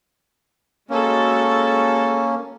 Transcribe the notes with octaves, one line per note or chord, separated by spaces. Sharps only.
G#3 A#3 C#4 F#4 A4